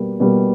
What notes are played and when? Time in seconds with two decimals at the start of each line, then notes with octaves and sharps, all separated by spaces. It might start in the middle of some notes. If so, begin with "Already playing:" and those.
Already playing: B2 G3 A#3
0.20 B2 G3 A#3